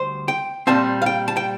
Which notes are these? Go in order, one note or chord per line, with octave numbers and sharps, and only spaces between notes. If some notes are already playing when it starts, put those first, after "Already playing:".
Already playing: D2 G3 C5
G5
A#2 G3 C4 A5
F5
G5
A5
G5